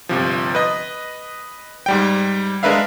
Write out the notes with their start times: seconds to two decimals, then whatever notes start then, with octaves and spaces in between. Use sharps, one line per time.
0.09 G1 C3 F3
0.55 B4 D#5
1.86 G#2 G3 G5
2.63 G#3 D4 A#4 B4 E5 F5